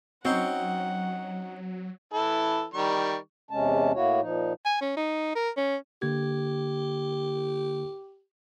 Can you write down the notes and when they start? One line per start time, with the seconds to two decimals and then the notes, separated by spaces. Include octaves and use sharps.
0.25 F#3 C4 C#4 D#4 F#4 F#5
2.13 E3 E4 A4
2.74 D#3 G3 C#6
3.51 E2 C3 G#3 C#4 A5
3.94 A2 A#3 E4 F#4 C#5
4.21 A#2 F3 D#4
4.65 G#5
4.81 C#4
4.97 D#4
5.35 A#4
5.57 C#4
6.02 D3 A#3 G4 G#6